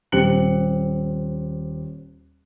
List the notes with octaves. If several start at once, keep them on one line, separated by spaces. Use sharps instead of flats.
D#1 C4 G4 F#6 C#7 F#7